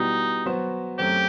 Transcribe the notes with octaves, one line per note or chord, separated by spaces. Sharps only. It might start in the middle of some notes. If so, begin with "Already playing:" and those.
Already playing: B2 G3 B3 D#4 E4 G4
F#3 B3 F#4 C5
F#2 F#3 A3 C4 G4